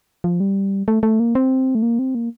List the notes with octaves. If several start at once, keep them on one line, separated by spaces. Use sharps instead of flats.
F3
G3
A3
A3
A#3
C4
A3
A#3
C4
A#3